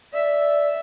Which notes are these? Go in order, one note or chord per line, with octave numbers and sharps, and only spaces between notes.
D5 E5